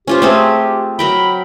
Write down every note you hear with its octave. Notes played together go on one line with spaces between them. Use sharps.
C#4 F4 G4 C5
A3 C4 G#4
F#3 A#4 G5 B5